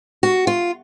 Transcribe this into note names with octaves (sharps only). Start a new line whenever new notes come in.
F#4
F4